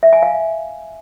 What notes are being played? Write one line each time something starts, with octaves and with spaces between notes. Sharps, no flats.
E5
G#5
F5